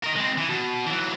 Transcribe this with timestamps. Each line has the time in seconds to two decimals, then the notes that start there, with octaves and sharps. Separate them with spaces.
0.03 A#4 D#5
0.16 G#3 C4
0.38 E3
0.49 B2
0.87 E3 F#3